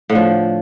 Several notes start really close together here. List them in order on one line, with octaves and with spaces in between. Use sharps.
A2 D3 F3